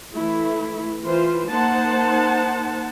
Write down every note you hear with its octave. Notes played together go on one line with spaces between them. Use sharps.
E3 A3 E4
E3 F4 C5
A#3 D#4 C5 F#5 A5